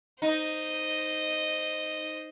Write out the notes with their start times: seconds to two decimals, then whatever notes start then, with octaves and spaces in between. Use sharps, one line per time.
0.22 D#4 C5 D#5